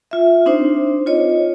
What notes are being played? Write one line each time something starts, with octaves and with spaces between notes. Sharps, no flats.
F4 E5
C4 D4 D#4 C5
F4 C#5 D#5